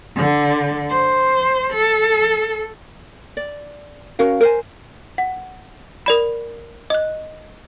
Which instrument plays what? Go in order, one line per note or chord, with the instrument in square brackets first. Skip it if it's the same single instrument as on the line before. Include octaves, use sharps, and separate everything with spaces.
[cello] D3
C5
A4
[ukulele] D5
C#4 F#4 A#4 F5
A#4 C5 G#5
[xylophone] F#5
A#4 D5 B5
D#5 F#6